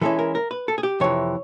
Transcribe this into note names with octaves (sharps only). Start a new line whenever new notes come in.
E3 G#3 C#4 E4 A4
A#4
A#4
B4
A4
G#4
G4
F2 C3 E3 C#5